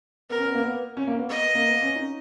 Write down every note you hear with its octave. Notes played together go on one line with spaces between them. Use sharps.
B3 A#4
C#4
B3
A#3
B3
C#4
A#3
B3
D#5
A#3
B3
C#4
D#4